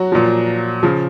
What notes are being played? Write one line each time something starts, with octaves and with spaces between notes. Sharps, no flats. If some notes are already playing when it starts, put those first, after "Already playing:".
Already playing: F#3 F#4
A#2 F3
C#3 F3